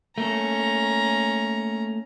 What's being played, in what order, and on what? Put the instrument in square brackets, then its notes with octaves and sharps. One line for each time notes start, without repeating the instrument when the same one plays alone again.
[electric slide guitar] A3 A#3 A4 [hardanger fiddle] C#4 A#5